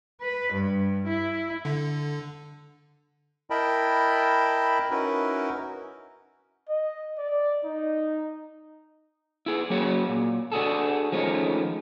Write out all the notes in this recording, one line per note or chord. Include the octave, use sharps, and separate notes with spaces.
B4
G2
E4
D3
E4 A#4 D#5 G5 A5 B5
C#4 D#4 E4 F#4 A#4 B4
D#5
D5
D#4
E4 G#4
F#3 A#3 C#4 F#4 G#4
A#2
D4 F#4 G#4 A4
D#3 F3 G#3 A3 C#4